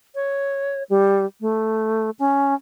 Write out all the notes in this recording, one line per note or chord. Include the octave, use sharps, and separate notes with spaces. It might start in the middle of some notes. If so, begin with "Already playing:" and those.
C#5
G3
A3
C#4